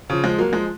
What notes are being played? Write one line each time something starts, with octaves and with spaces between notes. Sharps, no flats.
C#3 F3
F3 G#3
F#3 A#3
F3 G#3